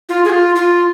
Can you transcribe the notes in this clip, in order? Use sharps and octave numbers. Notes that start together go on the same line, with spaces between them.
F4
G#4
F4
F4